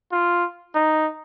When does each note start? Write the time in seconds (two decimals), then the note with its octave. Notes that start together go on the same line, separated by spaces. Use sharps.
0.12 F4
0.75 D#4